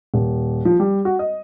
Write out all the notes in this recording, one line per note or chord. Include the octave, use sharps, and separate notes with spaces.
D#1
F3
G3
F#4
D#5